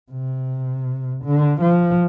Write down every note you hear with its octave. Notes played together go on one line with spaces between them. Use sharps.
C3
D3
F3